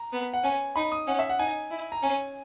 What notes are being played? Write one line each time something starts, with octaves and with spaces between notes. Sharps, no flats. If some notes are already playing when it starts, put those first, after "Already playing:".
Already playing: A#5
B3
F#5
C#4 G#5
D#4 B5
D#6
C#4 F#5
E5
F#5
D#4 G#5
E4
A#5
C#4 G#5